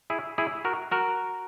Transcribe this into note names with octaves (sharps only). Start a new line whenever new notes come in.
E4 G#4
E4 G#4
F#4 A#4
F#4 A#4